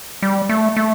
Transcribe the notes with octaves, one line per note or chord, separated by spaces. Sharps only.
G3
A3
A3